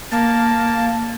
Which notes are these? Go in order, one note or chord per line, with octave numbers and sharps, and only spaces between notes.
A#3 A5